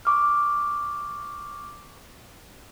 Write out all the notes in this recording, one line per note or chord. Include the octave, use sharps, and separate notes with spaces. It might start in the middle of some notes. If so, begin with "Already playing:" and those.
C#6 D6 F6